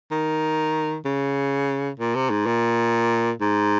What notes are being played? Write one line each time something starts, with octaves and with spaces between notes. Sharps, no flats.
D#3
C#3
A#2
C3
G#2
A#2
G#2